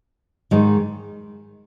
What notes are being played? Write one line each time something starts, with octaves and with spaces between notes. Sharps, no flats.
G#2 D#3 G#3